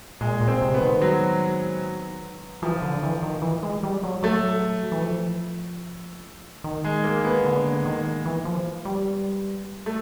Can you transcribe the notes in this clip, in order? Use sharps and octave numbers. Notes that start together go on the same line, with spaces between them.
A#2 G#3
A#2
C4
C3
B3
D#3
F#3
E3 F3
D3
E3
D#3
E3
G#3
G3
F#3
F#3 A3
E3
F3
D#3
G#3
A#3
B3
D3
D#3
E3
F3
G3
A3